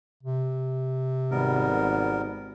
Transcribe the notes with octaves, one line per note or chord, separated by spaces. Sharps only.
C3
G#1 G3 B3 A#4